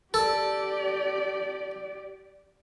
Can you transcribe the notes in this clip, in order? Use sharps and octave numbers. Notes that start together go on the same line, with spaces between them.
G4 A4 D5